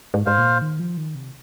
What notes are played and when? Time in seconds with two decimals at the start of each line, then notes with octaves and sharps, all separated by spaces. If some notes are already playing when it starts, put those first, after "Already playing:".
0.14 G#2
0.26 G#2 C5 F5
0.38 A#2
0.62 D#3
0.80 F3
0.97 D#3
1.15 C3